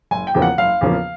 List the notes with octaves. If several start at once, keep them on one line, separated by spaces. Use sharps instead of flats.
F#1 G#5
G5
E2 C#3 F3 A#3
F#5
F#1 F5
E2 C#3 F3 A#3